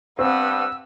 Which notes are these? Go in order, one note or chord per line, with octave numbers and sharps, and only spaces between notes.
G2 B3 C4 F#5 E6